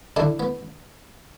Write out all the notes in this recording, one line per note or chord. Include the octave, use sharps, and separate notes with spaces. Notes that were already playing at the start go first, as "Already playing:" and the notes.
D3 D4 E4
B3